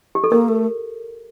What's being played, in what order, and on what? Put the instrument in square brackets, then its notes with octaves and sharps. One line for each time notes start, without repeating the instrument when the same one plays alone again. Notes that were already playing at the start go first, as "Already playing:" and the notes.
[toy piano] G4
A4
[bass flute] A#3 [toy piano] A#4
[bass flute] A3